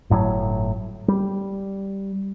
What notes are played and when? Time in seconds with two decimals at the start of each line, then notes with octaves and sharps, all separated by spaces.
0.10 G1 A2 C3 F#3
1.08 G3